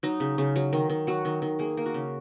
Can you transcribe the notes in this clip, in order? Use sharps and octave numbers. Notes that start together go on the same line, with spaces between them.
F#3 D#4
C#3
C#3
F#3
D#3
D#3
F#3 F#4
D#3
D#3
A#3 G#4
A#3
F#4
C#3